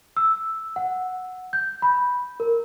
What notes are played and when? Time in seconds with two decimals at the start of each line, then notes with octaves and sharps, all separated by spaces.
0.17 E6
0.76 F#5
1.53 G6
1.82 B5
2.40 A#4